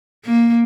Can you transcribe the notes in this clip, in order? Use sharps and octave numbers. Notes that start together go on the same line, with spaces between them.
A#3